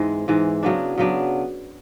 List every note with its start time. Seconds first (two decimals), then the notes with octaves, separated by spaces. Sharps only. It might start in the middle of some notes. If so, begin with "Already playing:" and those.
Already playing: G#2 E3 G#3 C4 E4
0.28 G#2 E3 G#3
0.63 C#3 F#3 B3 D4
0.98 C#3 F#3 B3 D4